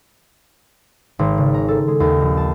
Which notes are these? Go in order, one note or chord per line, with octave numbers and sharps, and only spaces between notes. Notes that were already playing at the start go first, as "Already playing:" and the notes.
G#1
C#3
A#5
A4
G#3
D#2
A#1
A5